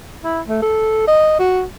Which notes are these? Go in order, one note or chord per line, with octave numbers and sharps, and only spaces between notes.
E4
A3
A4
D#5
F#4